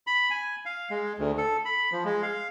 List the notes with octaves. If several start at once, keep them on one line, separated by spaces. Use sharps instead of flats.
B5
G#5
F5
G#3
D2
A4
B5
F3
G#3
F5